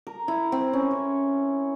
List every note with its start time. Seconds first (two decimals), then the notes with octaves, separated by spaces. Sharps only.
0.07 A#4
0.28 E4
0.52 C4
0.73 C#4
0.91 C#5